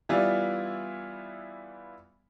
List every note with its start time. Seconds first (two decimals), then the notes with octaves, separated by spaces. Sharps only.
0.09 E3 G3 B3 E4 F4 D5